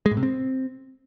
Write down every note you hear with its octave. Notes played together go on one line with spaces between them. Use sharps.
G#3
A2
C3
C4